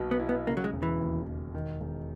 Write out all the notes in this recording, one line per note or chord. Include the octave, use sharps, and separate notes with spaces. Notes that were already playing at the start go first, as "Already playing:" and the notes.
Already playing: B1 B2 A#3
B3
E4
B3
C#3 A#3
F#3
G#3
E1
E3
D#2
E1
D#3
E1